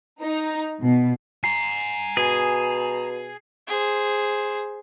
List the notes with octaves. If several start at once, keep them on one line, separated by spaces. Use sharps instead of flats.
D#4
B2
G#5 A#5 C7
B2 G#4
G#4 C5